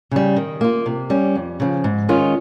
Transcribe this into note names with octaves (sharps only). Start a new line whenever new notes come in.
C#3 G3
D#3
A#3 F4
C3
G3 C#4
F2
C#3 F3
G#2
D#3 G#3 C#4 F4